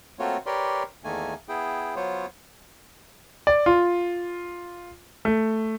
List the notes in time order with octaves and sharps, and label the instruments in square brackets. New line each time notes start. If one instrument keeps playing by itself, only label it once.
[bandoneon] A3 A#3 C4 F4 F#4 C#5
G4 A#4 B4 C#5 D5 C6
E2 D#3 A3 A#3 G#5
B3 E4 G#4 G5
F#3 B3 F4 C5 C#5
[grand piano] D5
F4
A3